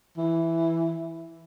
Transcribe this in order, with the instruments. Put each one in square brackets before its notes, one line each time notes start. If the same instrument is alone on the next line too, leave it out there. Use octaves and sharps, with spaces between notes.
[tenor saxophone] E3